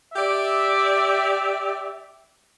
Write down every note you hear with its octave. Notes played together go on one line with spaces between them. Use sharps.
G4 D5 E5